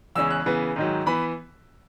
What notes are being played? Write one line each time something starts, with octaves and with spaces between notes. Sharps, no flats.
E2 C#3 G#3 C#4 E6
F#6
C#3 E3 B3
G#2 D#3 F#3
E3 B3 B5